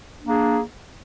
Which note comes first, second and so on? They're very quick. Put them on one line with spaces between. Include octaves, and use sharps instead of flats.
D4 A#3 G#4